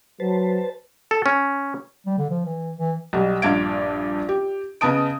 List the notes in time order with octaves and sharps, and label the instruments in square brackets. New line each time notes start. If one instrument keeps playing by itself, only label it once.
[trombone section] F#3 [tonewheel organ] B4 C5 A5
[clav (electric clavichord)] A4
C#4
[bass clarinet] G3
D3
F3
E3
E3
[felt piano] B1 G3
A#1 G2 D4 F5 G#6 D7
G4
C#3 B3 D#5 A5 D#6 D7